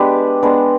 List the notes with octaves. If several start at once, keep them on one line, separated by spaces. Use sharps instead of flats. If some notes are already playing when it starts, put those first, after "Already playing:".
Already playing: G#3 B3 D4 G4 B4
G#3 B3 D4